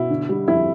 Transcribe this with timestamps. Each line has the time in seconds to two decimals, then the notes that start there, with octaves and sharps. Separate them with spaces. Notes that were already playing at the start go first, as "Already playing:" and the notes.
Already playing: B2 E4
0.10 D3
0.29 G3
0.48 F2 E4